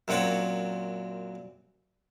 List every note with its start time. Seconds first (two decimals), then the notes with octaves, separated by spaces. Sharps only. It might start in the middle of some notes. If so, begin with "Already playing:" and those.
0.08 F#2 A#2 C4 F#4 C#5 A5